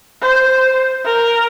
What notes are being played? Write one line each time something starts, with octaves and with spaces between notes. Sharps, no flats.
C5
A#4